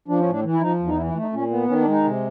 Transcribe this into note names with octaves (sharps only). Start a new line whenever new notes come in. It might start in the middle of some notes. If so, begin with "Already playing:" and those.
F3 D4
C#4
A2 D4
E3
E4
F3 D#4
E2
D#4
E3 E4
E4
A3
D#4
A#2 C#4
B3
D#3 C#4
D4
G#3
D#4
C3